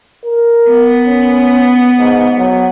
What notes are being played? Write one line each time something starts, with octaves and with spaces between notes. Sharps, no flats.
A#4
B3
C#4
G#2
F#3